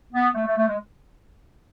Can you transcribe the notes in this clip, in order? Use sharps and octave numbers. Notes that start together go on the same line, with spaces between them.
B3
A3
A3
A3
G#3